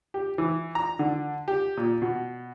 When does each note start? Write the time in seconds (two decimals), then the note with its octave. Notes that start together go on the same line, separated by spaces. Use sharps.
0.14 G4
0.38 E3
0.75 A#5
0.99 D3
1.48 G4
1.77 A#2
2.02 B2